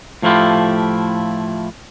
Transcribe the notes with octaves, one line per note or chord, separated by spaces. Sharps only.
A2 F3 A3 E4 F4 G4